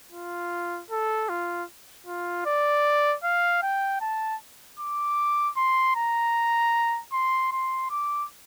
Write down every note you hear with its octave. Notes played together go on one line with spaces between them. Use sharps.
F4
A4
F4
F4
D5
F5
G5
A5
D6
C6
A#5
C6
C6
D6